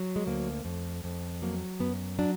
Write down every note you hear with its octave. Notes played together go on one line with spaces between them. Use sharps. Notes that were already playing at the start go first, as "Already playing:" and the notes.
Already playing: F#3
G#3
D2 A#3
F2
F2
F#3 A#3
F#2 B3
F#3 D4